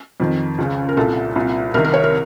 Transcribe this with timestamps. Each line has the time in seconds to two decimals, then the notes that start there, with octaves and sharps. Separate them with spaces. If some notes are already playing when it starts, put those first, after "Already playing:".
0.20 F2 D#3
0.58 C#2 C#3
0.89 A#4
0.97 C2 A#2 A4
1.36 C2 A#2
1.74 C2 C3 D#3 A#4
1.85 A#4
1.94 C#5
2.04 A#4